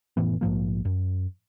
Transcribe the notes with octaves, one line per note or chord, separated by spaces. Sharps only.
F1 A2 E3 B3
A#1 G#2 F3 A#3
F#2